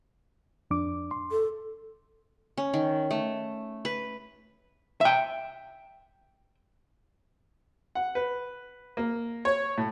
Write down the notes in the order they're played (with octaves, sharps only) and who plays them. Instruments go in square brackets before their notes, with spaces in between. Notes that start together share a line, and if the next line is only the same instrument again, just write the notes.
[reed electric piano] F2 D4 D6
C6
[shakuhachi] A4
[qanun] C#4
D#3
A3
B4
[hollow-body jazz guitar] E5 G5
[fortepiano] F#5
B4
A#3
C#5
A2